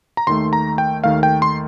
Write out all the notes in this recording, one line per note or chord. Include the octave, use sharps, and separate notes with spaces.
A#5
D#2 D#3 A3 C6
A#5
G5
D#2 D#3 A3 F5
G5
C6